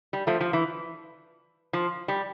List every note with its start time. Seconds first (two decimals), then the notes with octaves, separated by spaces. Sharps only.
0.13 G3
0.27 F3 A3
0.40 F3
0.53 E3
1.73 F3
2.08 G3